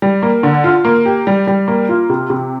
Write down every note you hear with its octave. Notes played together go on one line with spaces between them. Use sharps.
G3
A#3
D3
F4
A#3
G4
G3
G3
A#3
F4
C3
C3